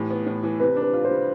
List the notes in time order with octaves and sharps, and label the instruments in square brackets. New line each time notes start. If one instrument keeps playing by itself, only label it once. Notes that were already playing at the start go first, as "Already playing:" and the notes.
Already playing: [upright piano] A2 E3 [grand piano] G4
[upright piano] B3
A2
E3
[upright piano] C3 [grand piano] B4
[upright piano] D4
[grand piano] B4
[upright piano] F4
[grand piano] C5
[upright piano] G3